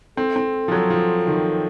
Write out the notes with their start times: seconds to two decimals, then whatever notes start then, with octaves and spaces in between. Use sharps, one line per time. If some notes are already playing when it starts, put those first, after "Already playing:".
0.17 C4 A4
0.36 C4
0.68 F3
0.72 F#3
0.90 F3
1.27 D#3